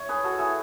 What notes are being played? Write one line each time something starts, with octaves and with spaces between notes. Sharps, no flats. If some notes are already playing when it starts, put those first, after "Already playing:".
Already playing: E4 C#5
G#4 B4
F#4 A4
E4 G#4